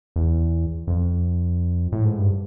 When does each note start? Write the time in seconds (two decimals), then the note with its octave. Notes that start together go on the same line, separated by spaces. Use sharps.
0.16 E2
0.87 F2
1.92 A2
2.05 G#2
2.18 G2